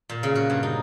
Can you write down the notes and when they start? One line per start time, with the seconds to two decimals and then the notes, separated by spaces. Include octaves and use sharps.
0.09 A#2
0.23 C#3
0.35 F#4
0.50 G2
0.63 D#4